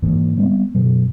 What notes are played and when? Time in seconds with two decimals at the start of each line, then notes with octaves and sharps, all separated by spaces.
0.02 G#2 E3 A#3
0.37 G3 G#3 B3 C4
0.75 F#2 B2 F#3